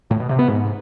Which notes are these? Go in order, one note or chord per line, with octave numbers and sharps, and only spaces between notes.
A2
B2
C3
B3
G#2